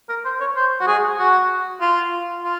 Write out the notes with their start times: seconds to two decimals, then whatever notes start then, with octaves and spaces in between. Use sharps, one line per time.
0.09 A#4
0.25 C5
0.40 C#5
0.56 C5
0.81 F#4
0.87 G#4
1.19 F#4
1.81 F4
2.44 F4